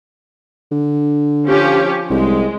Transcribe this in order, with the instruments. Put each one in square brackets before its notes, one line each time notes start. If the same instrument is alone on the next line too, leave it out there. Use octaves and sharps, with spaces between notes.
[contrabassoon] D3
[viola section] F3 C#4 G4
[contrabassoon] C2 [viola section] G#3